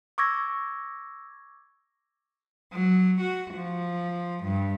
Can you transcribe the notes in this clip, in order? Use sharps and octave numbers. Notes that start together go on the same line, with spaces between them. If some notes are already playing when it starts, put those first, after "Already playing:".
C#6 D6 E6 G#6 A#6
F#3
F#4
F3
G2